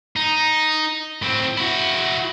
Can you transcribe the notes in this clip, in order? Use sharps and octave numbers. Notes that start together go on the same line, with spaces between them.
D#4
A2 C4
E4 F#4